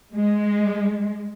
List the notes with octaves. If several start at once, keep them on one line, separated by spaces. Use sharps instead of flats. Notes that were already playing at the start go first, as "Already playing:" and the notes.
G#3